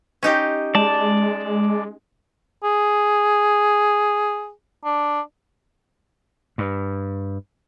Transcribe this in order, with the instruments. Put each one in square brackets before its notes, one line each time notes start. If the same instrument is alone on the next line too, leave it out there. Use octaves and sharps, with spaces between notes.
[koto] C#4 D#4 G4
[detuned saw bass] G#3 [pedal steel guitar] D5 A5
[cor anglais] G#4
D4
[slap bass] G2